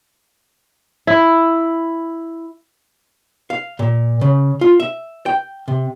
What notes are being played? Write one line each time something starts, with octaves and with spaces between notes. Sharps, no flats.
E4
F5
A#2
C#3
F4
E5
G5
C3